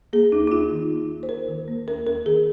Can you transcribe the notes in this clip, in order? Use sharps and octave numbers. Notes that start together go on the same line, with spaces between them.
A#3 G#4
D#2 D#4
D#4
D#2 F4
D#3
A#3
D#2
C5
D#2 A#4
D#3
A#3
D#2 A#4
D#2 A#4
D#3 G#4